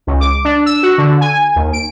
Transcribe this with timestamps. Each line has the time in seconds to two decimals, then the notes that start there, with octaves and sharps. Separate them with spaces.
0.07 C#2
0.20 D6
0.45 D4
0.66 E6
0.83 F#4
0.98 D3
1.21 G#5
1.56 D#2
1.73 D7